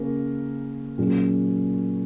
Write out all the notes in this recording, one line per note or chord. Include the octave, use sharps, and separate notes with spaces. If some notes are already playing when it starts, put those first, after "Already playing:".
Already playing: C#3 A#3 C#4 A#4
A#2 F#3 C#4 G#4